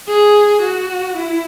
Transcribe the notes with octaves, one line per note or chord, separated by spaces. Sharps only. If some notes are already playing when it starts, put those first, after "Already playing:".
G#4
F#4
E4